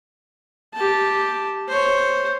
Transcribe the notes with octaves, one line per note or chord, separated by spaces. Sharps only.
G4 A5
C5 C#5